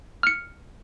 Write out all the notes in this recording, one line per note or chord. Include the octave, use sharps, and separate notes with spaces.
F6 C#7